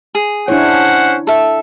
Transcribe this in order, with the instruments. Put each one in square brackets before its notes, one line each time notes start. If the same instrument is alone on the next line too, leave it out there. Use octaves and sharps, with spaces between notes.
[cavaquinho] G#4
[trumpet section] C#4 C5 F#5 [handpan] D4 E4 C#5
[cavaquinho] A4 E5